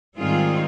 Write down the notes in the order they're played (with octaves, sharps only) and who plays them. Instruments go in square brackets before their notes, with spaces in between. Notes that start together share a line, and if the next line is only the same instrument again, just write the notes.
[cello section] G#2 D#3 G3 C4 F4 G#4